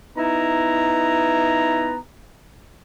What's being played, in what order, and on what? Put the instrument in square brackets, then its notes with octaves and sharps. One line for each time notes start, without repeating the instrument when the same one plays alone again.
[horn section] B3 D#4 E4 A#5